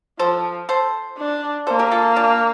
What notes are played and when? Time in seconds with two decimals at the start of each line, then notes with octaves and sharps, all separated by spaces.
0.19 F3 A4 C5
0.69 A4 C5
1.18 D4
1.67 A#3 A4 C5
1.79 G4 A#4
1.91 F4 A4
2.16 D4 F4